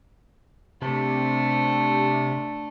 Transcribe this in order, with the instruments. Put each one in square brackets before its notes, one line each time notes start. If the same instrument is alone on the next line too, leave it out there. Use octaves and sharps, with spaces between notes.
[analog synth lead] C3 [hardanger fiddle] A3 D4